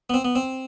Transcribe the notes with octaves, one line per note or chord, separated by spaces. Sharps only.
B3
C4
B3
C4